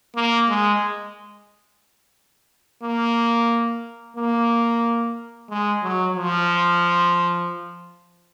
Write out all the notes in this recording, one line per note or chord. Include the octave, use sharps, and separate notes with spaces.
A#3
G#3
A#3
A#3
G#3
F#3
F3